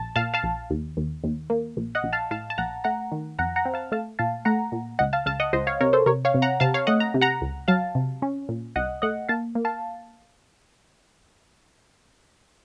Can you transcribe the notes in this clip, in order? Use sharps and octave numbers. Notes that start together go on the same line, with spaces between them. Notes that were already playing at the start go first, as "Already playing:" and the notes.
Already playing: A#1 A5
A#2 F5 A5
F5 A5
A#1
D#2
D#2
D#2
A#3
A#1
D#5 F#5
A#1
F5 A5
A2 F5 A5
A5
A#1 F#5 A#5
A3 F#5 A#5
D#3
F2 F#5 A#5
F#5 A#5
C4
F5 A5
A3 F5 A5
A#2 F5 A5
A3 F#5 A#5
A#2
C#2 D#5 F#5
F5 A5
C#2 F5 A5
D#5 F#5
C#2 C5 D#5
C#5 F5
C3 A#4 C#5
A4 C5
C3 A#4 C#5
C#5 F5
C3
F#5 A#5
C3 F5 A5
C#5 F5
A3 D#5 F#5
A#5
C3
F#5 A#5
C#2
F#3 F5 A5
C3
C#4
A#2
C2 D#5 F#5
A3 D#5 F#5
A#3 F5 A5
A#3
F5 A5